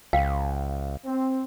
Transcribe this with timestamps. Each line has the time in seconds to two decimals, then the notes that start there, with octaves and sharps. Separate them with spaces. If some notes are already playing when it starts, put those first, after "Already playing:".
0.13 C#2 F5 G5
1.06 C4